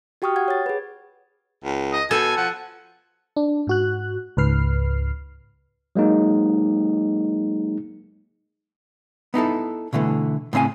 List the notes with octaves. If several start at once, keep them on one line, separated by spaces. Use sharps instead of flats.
F#4 G4 G5 C#6 D#6 F6
F#5 G#6
C#5 A6
G#4 B4
C#2
D#5
B2 A4 G#5
F3 F#5
D4
G#2 F#4 F#6
C#2 G#2 B4 F6 C7
F#3 G#3 A#3 D#4
B3 D#4 E4 A4
B2 D3 E3 A3
A2 C#3 C4 E5 G#5